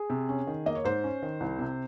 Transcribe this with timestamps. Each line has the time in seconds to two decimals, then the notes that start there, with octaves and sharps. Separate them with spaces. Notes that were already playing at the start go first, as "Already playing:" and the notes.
Already playing: G#4
0.10 C3
0.29 C#4
0.47 D#3
0.66 A#3 D#5
0.75 C#5
0.84 G#2 C5
1.04 C#4
1.22 D#3
1.40 C2
1.59 C3